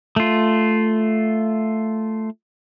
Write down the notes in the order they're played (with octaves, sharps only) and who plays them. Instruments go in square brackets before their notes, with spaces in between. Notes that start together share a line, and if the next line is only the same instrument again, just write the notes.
[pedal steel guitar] A3 F4